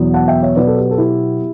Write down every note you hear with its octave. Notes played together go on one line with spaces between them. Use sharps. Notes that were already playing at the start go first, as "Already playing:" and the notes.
Already playing: E2 B2 F#3 B3
F#5 A5
E5 G5
C#5 E5
B2 F#3 B3 B4 D5
A4
G4 B4
A4
E4 G4